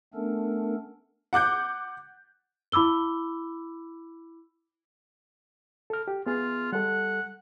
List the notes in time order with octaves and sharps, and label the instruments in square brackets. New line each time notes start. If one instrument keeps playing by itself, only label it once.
[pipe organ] A3 B3 C#4 D4 A4 A#4
[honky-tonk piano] F#5 D6 F#6 G6
[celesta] E4 B5 D6 E6 G7
[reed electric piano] A4 F6
G4
[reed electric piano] B3 G#4 [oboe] F4
[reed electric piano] G3 A4 [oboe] F#5